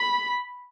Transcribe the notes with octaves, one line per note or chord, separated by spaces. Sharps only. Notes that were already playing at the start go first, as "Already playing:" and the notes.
Already playing: B5